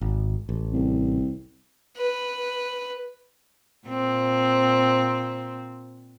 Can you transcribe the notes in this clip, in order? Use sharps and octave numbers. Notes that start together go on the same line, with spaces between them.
G#1
A1
C2
B4
A#2 C4